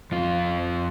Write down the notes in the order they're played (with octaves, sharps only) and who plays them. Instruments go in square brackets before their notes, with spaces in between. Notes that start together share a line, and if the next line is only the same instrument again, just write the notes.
[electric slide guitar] F2 F4